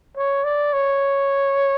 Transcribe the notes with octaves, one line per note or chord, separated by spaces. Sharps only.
C#5
D5
C#5